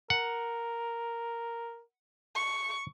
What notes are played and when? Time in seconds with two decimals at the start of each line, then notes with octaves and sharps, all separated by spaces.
0.10 A#4 F#5
2.36 C#6